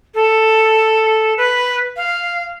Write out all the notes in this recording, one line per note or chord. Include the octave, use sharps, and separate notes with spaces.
A4
B4
F5